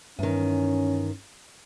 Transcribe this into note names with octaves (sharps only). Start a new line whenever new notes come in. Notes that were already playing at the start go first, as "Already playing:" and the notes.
E2 G2 D#3 C#4